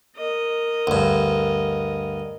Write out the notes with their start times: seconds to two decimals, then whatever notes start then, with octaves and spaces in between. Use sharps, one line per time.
0.17 A#4 D#5
0.87 D2 G2